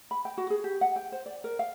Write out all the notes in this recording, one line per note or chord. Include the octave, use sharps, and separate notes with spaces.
B5
G5
F#4
G#4
G4
F#5
G5
C5
D5
A#4
F5